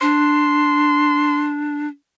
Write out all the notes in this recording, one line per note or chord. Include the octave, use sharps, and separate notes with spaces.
D4 C6